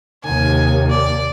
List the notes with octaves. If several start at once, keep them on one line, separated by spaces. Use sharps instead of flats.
D#2 C3 G#5
D5